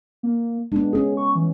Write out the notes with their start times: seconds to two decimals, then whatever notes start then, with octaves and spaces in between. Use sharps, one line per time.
0.23 A#3
0.72 G#3 B3 D4
0.93 B3 C#4 G#4
1.17 C#6
1.35 E3